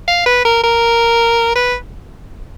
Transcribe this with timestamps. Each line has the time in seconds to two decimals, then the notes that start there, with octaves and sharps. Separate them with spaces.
0.08 F5
0.26 B4
0.45 A#4
0.64 A#4
1.56 B4